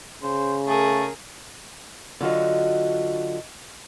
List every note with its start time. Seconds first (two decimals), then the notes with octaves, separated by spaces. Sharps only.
0.23 C#3 C5
0.67 A3 G#4 A#4
2.21 D3 F#3 F4 F#4 D#5